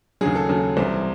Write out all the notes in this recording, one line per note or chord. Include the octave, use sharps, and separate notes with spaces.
D#2 C#3 F#3 G#4
A4
D#2 C#3 F#3 A4
C2 C3 E3 C5